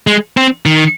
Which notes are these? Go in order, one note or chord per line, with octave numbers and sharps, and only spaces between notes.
G#3
C4
D#3